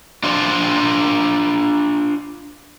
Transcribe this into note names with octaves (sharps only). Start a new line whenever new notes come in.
D4 F4 C5